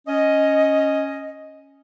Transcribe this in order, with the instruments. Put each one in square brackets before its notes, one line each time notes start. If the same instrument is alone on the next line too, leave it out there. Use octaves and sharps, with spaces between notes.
[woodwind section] C#4 D#5